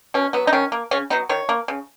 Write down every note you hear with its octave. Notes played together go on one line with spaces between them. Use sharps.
B2 C#4
F#3 B3
D#4
D#3 C#4
A#3
C#3 C#4
F#3 B3 D#4
D#3 C#5
A#3
C#3